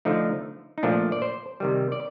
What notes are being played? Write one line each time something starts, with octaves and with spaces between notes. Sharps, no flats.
D3 F3 A3 D#4
D#4
A#2 F3 A3 D4
D5
C5
C3 D#3 G3
D5